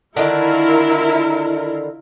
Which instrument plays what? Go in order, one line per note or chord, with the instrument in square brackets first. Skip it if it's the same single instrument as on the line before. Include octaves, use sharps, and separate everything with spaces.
[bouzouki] D3 D#3 [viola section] E4 F4 A#4